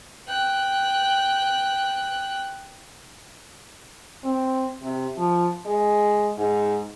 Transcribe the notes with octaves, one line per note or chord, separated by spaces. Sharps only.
G5 F#6
C4
C3
F3
G#3
G#2